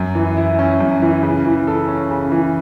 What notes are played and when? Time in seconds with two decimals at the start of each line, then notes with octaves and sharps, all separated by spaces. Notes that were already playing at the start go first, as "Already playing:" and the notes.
Already playing: F#2
0.15 E3
0.37 E4
0.59 C#4
0.80 F#2
1.02 E3
1.23 C#3
1.45 E3
1.67 A4
1.88 C#4
2.11 C#3
2.31 E3